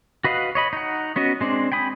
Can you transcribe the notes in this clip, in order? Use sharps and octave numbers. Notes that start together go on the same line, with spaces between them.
F#4 B4 D#5 F5 F#5
C#5 D#5 B5
D#4 F#5
B3 C#4 F#4 D#5
G#3 C4 D4
G5 G#5 B5 D#6